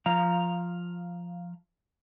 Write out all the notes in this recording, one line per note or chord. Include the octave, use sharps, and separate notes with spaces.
F3 F5 A#5